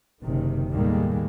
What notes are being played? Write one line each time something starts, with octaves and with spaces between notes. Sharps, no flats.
F#1 C3 D#3
D#2 A2 D#3 G3 G#3 A#3